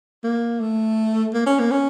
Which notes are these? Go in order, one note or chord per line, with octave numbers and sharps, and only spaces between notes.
A#3
A3
A#3
C#4
A#3
C#4